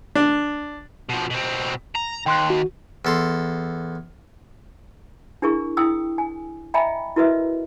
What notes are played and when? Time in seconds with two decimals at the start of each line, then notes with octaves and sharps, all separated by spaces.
0.15 D4
1.09 B2 F3
1.30 B2 C4
1.95 A#5
2.26 D#2 G5 C6 F#6
2.50 F#4
3.05 E2 A4 C6
5.42 D4 E4 G#4 A#4 C#6
5.77 E4 G5 D#6 E6
6.18 G#5
6.74 D#5 E5 G5 G#5 A#5 B5
7.16 E4 F#4 A#4 B4 D#5 E5